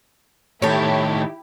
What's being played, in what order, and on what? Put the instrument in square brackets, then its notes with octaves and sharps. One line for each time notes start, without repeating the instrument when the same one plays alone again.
[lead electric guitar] A2 D#3 [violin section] E4 G4 [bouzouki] A4 C#5